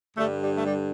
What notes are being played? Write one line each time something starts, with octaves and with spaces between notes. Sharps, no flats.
G2 D3 G3 A3
G3
A3
G3